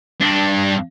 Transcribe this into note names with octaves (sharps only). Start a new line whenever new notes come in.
G2 D4